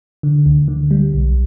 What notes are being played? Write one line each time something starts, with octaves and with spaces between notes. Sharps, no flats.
D3
D2
D3
G3
B1